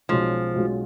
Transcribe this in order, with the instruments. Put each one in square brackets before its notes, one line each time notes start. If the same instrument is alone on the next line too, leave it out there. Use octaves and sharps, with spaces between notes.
[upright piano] B1 B2 G#3 C#4 F4 [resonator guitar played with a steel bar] F3
[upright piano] B1 B2 G#3 C#4 F4